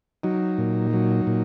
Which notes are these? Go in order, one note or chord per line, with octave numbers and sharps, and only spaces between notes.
F#3 D#4
A#2
F#3
A#2